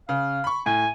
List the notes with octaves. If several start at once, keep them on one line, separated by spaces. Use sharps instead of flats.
C#3 F5
B5 C#6
A2 G#5